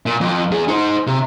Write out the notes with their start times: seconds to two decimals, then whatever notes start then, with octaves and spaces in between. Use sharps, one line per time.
0.06 A#2
0.21 F2
0.51 E2 G#4
0.68 D#4 C5
1.07 C3